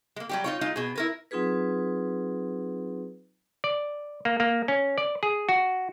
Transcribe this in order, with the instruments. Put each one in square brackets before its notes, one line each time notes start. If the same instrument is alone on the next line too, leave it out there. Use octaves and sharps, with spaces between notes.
[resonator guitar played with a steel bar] G#3 A#3
F#3 G3 G4
D#4 F4 C#5
G#3 D#4 F4
B2 G#4
E4 A#4 B4
[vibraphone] F#3 C4 D#4 F4 G#4 B4
[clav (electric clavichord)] D5
A#3
A#3
C#4
D5
G#4
F#4